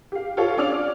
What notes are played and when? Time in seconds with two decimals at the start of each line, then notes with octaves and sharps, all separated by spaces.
0.12 G4 F5
0.37 F4 G4 A4 C#5 F5
0.57 C#4 D4 D5 D6 F6 F7